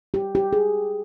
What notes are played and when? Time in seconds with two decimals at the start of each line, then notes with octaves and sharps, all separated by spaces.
0.14 G4
0.35 G4
0.53 G#4